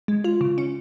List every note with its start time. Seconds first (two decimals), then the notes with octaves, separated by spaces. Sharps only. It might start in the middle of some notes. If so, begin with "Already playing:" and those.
0.08 G#3
0.24 F4
0.41 C#3
0.58 C#4